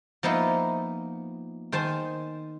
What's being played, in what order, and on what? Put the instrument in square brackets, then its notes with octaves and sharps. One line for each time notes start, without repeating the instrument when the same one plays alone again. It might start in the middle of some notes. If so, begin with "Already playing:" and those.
[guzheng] F3 A#3 B3 D#4 E4
D#3 C5 G#5 A5